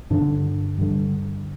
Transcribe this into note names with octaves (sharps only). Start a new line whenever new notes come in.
G2 D3 D4
G2 D3